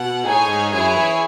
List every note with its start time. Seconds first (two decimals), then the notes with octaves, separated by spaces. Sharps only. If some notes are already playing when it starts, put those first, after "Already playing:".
Already playing: B2 F#5
0.24 A2 D#4 G#4 C#5 G#5
0.48 G#2
0.72 F#2 E4 G#4 C#5 G#5
0.96 E3